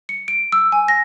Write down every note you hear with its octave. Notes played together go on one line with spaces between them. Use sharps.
C#7
D7
E6
G#5
A#6